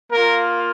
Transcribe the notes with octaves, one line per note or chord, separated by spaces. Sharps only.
A#3 F4 A#4